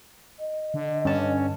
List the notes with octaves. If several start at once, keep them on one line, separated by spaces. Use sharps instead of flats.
D#5
D3
G2 D3 C#4 A5